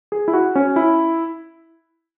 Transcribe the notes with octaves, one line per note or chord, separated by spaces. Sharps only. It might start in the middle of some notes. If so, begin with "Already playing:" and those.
G#4
E4
F#4
C#4
E4